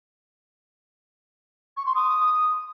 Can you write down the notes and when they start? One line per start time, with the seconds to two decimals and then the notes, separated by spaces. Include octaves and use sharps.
1.77 C#6
1.86 C6
1.95 D#6